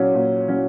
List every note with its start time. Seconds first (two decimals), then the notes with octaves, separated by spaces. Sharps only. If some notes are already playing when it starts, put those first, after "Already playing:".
Already playing: A#2 F#3 C#4
0.15 A#2
0.48 F#3 C#4